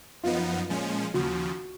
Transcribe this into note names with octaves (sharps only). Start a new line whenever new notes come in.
F#2 F3 B3 D#4 F4
A#2 F3 G#3 C#4
D#2 C#3 F3 F#4